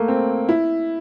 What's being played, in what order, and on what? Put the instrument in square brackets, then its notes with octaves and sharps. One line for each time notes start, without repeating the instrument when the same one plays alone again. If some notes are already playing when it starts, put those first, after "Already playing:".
Already playing: [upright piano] A3 A#3
C4
E4